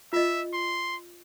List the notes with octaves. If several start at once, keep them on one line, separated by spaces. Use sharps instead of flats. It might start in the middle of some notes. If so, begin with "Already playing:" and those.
F4 D#5 E5
C6